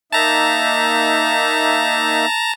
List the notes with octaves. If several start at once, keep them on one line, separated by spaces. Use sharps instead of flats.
A#3 D#4 E5 A5 A#5